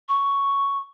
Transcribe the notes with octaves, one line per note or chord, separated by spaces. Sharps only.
C#6